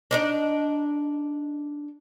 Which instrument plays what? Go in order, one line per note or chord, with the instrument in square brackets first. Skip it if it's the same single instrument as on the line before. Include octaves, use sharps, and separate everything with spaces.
[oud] D4 D#4 D5